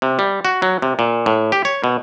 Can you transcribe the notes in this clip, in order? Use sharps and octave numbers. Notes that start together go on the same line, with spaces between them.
C3
G3
F#4
F#3
C3
A#2
A2
G4
C#5
B2